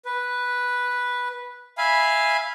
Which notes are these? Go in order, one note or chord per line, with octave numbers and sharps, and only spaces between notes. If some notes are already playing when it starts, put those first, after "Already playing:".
B4
E5 F5 G#5 B5